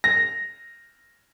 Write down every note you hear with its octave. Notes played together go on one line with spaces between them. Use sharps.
A#6